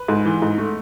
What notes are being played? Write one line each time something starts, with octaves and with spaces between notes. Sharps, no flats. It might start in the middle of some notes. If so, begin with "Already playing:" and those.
Already playing: B4
G#2
E3
G#2
A3